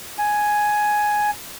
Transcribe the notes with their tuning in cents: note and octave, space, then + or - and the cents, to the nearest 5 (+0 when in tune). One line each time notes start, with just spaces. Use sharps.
G#5 +5